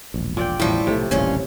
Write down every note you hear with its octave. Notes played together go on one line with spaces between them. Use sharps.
E1 A#1
A#2 D5 G5
E1 A1 A2 F3 G3 E4
B1 C3 G#3 A3
D#1 A1 G2 A#2 C#4